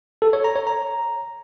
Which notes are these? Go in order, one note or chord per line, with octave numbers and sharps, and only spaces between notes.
A4
C#5
A#5
C#5
A#5